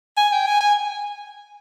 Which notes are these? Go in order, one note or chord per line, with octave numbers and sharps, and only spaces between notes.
G#5
G5
G#5
G#5